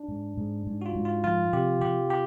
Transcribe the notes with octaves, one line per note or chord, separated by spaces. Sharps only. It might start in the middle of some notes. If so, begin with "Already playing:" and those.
Already playing: D4
G#2
G#2
G#2
F#4
F4
G#2
F4
F3 F4
C3 G4
C3 G4
G4